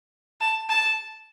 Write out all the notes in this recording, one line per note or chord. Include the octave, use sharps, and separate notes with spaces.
A5
A5